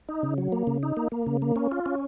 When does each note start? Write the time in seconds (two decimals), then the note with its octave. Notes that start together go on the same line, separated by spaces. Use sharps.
0.09 D#4
0.23 C#3
0.38 F#3
0.52 A#3
0.67 C#3
0.83 D#4
0.97 A#3
1.12 A#3
1.27 C#3
1.42 A#3
1.56 C#4
1.72 F4
1.86 C#4